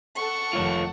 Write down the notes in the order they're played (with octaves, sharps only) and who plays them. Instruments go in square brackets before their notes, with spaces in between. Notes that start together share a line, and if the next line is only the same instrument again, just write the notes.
[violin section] A4 F#5 [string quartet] C#6
[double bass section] F1 D#3 A3 [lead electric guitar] F4 C#5